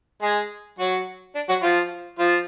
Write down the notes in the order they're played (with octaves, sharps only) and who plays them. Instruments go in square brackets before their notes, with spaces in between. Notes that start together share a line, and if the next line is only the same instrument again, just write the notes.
[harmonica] G#3 G#4
F#3 F#4
D4
F#3 F#4
F3 F4
F3 F4